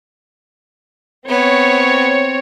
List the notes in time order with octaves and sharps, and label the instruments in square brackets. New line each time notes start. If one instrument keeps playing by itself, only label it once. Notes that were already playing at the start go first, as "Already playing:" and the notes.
[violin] B3 [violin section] C4 C#5